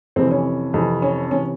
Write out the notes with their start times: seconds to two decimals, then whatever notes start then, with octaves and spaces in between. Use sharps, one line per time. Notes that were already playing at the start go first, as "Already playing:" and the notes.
0.16 F2 C3 E3 C4
0.31 C#4
0.74 F2 C3 E3
1.02 C#4
1.31 C3 E3 C#4